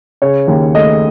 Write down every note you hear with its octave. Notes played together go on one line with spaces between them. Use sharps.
C#3 C#5
D#2
A3 D#5